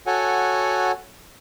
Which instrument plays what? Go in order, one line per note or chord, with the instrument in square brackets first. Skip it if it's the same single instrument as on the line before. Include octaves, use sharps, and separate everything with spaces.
[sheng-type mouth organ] F#4 A4 C#5 F#5 G#5